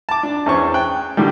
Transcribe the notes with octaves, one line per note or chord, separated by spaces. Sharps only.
A5 D6
D4
E2 C#4 C5 C#6
G5 F#6
A2 D3 D#3 G3